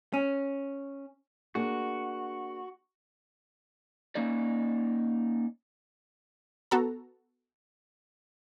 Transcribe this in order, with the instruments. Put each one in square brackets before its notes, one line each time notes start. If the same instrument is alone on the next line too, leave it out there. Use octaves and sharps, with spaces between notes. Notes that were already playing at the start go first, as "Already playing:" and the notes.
[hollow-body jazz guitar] C#4
[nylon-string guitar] A#3 D4 G#4 [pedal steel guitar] F#4
[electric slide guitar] A#3 C#4 D#4 D5
[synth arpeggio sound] B3 F#4 A4 A#5